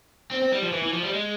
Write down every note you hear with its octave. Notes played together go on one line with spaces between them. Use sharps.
C4
C4
G3
F3
E3
E3
F3
G3
G#3